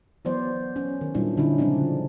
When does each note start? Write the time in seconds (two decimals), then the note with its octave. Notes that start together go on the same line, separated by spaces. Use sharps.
0.25 E3 F#3 B3 C5 D5
0.76 C#4
1.01 D#3
1.15 A#2 F#3 G3 D4 E4
1.37 D3 C#4 D#4 E4
1.58 C#3 F3 G#3 C4 D4